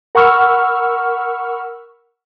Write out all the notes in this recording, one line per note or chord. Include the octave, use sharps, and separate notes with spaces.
A#4 F#5 B5 C#6 E6 F6